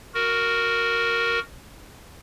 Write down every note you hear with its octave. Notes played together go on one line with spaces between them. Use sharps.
F#4 A#4